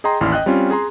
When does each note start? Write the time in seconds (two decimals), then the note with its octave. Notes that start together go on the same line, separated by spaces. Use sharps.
0.04 G#4 D#5 G5 A#5 C6
0.21 A1 D#2 E4 D5 C6 F6
0.32 D#5 G5 F#6
0.46 G3 C4 C#4 F4
0.71 G#4 A#5 C6